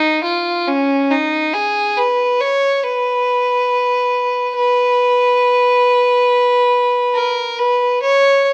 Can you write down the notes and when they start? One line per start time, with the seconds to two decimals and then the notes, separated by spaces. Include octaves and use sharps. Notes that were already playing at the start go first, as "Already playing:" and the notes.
Already playing: D#4
0.24 F4
0.68 C#4
1.11 D#4
1.53 G#4
1.97 B4
2.40 C#5
2.83 B4
4.56 B4
7.15 A#4
7.59 B4
8.02 C#5